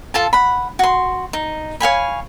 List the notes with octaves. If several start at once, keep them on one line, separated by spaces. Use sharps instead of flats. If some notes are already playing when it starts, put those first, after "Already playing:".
F4 A4 A5
F#5 B5
F#4 C6
D#4
C#5 F5 G#5 B5